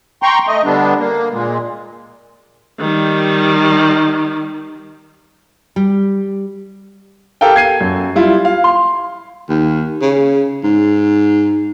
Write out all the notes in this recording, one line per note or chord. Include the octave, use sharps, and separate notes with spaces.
G5 A#5 C6 C#6
A3 D#5
D3 G3 B3 D4
A#3
A#2 G#3
D#3 G3
G3
G4 A4 A#4 F5 G5
G#6 C7 D#7
F#2
G3 E4 F4
F5
C6
D#2
C#3
G#2